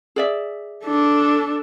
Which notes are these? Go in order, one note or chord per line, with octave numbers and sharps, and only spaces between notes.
G#4 D5 E5
D4 A4